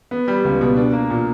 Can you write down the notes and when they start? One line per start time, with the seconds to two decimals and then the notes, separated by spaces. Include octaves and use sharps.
0.11 B3
0.28 G3
0.44 C#2
0.61 B2
0.76 D4
0.93 A#3
1.10 A#2